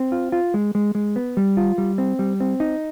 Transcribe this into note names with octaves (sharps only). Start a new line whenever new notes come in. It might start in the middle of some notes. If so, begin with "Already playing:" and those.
Already playing: C4
F4
F4
G#3
G#3
G#3
B3
G3
F4
G3
C4
G3
C4
D#4